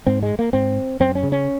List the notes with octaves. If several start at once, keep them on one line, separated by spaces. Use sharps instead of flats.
G#2 C4
G#3
A#3
G#2 C4
F#2 C4
C#4
C#3
C#4